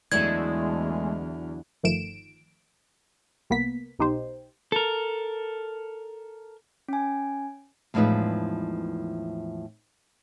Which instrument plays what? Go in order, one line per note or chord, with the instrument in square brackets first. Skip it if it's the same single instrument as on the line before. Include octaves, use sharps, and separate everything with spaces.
[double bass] E2 [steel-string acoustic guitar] D3 F#3 E4 [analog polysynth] G#3 A3 [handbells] G#6
[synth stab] G1 D#3 F3 A3 D7 E7
C2 A#3 B3 B6
B1 B2 D#4 G4 C5
[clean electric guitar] A4 A#4
[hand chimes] C#4 G#5
[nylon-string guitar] E2 A2 F3 G#3 D#4 B4